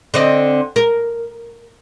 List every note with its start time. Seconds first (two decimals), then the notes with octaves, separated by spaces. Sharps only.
0.14 D3 C4 D#5
0.76 A#4